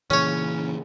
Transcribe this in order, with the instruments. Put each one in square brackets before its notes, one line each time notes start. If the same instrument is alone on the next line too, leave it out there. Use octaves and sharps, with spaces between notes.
[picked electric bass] A#2 E3 [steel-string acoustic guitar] C#3 [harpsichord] C#4 C#5